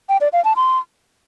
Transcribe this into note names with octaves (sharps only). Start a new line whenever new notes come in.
G5
D5
F5
A5
C6